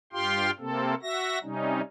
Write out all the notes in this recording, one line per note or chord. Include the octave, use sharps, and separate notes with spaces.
G2 F4 G4 F5 G5 C6
C3 A#3 C4 A4
F#4 E5 A#6
C3 G3 C#4 D#4